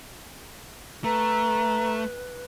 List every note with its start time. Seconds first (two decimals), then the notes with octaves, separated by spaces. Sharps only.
1.04 A3 B4 A#5